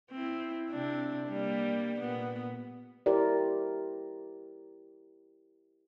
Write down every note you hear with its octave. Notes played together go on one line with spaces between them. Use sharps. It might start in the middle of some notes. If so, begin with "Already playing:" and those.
C4 E4
C3 C4 D4
G3 A#3
A#2 B3
E4 G4 A#4 C5 D5